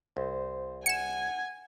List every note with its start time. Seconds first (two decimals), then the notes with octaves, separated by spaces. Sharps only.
0.17 C2 C5
0.86 F#5 G#5 G#6 C#7 E7